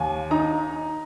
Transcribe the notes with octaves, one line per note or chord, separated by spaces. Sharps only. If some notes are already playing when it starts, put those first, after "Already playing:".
Already playing: D#2 G#5
D#4 A#5